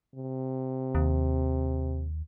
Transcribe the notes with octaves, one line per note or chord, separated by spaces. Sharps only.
C3
D#2